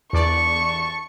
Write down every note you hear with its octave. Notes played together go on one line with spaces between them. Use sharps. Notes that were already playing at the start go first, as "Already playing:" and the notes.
E2 D5 A5 C#6